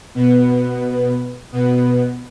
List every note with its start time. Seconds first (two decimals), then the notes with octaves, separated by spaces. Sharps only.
0.15 B2 B3
1.52 B2 B3